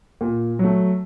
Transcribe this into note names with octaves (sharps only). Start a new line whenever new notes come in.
A#2
F#3 A3